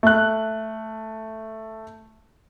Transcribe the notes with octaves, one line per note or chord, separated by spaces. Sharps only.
A3 F#6